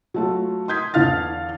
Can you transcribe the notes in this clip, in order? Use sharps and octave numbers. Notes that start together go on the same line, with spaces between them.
F#3 A3 F4
C6 D#6 G6 G#6 B6
E2 D3 E3 F5 F6 A6